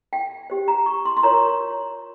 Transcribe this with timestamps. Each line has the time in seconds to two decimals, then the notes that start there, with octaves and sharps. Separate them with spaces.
0.13 G5
0.50 G4 C5
0.68 A#5
0.86 C#6
1.05 C6
1.17 C6
1.23 F4 A#4 C#5 A#5